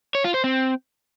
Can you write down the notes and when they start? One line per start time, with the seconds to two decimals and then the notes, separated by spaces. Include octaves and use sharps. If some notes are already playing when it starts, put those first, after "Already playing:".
0.15 C#5
0.24 F4
0.34 C5
0.44 C4